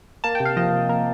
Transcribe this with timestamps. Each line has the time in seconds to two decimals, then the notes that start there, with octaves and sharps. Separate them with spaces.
0.24 A#3 A5
0.35 G5
0.40 C3
0.45 F5
0.57 F3 D#5
0.72 C3
0.89 A#3 A#4